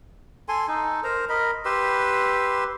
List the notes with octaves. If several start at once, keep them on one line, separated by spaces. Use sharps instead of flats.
A4 G#5 C6
D#4 A4
A#4 C5 A#5
A#4 D#5 B5
G4 B4 C6 E6